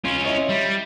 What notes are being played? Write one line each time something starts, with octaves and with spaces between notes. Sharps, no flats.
C#4 F4
E4 C#5 D#5
G3